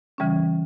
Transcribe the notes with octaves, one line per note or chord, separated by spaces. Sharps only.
C#3 E3 G3 C#4